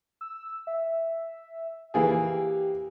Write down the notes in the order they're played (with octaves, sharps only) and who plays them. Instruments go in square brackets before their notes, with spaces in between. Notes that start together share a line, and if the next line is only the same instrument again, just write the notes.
[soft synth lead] E6
E5
[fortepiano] E3 A#3 G#4 [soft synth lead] G4